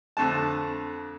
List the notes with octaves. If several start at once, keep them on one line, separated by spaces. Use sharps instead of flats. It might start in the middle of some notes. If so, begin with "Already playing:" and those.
F2 D3 A3 A5